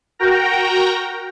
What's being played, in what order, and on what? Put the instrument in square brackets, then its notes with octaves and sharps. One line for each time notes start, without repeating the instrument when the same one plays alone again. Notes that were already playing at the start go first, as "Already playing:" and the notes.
[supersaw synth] F#4 A#4 G5 A#5